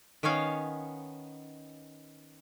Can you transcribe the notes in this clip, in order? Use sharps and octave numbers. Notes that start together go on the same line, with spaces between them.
D#3 B3 C#4 C#5 F5